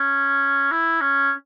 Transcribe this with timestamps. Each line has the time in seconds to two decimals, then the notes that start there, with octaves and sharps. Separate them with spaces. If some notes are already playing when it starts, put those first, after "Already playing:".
Already playing: C#4
0.72 E4
1.01 C#4